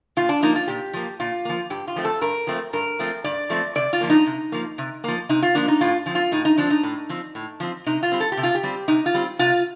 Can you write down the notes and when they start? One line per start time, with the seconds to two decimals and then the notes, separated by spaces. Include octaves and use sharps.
0.17 A#2 F4
0.29 D4
0.42 F3 A#3 D#4
0.56 F4
0.68 A#2 G4
0.93 F3 A#3
1.20 A#2 F4
1.45 F3 A#3
1.70 G2 G4
1.88 F4
1.96 F3 A3 C4
2.05 A4
2.21 G2 A#4
2.47 F3 A3 C4
2.73 G2 A#4
2.99 F3 A3 C4
3.24 G2 D5
3.50 F3 A3 C4
3.75 C3 D5
3.93 F4
4.01 F3 A#3
4.10 D#4
4.26 C3
4.52 F3 A#3
4.78 C3
5.04 F3 A#3
5.29 C3 D#4
5.42 F4
5.55 F3 A#3 D4
5.68 D#4
5.81 A2 F4
6.06 F3 C4
6.15 F4
6.32 A2 D#4
6.45 D#4
6.58 F3 C4 D4
6.70 D#4
6.83 A2
7.09 F3 C4
7.35 A2
7.60 F3 C4
7.86 C3 D#4
8.03 F4
8.12 G3 C4
8.20 A4
8.32 G4
8.37 C3
8.43 F4
8.55 G4
8.63 G3 C4
8.88 C3 D#4
9.06 F4
9.14 G3 C4
9.39 C3 F4